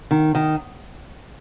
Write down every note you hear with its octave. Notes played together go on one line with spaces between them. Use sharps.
D#3
D#3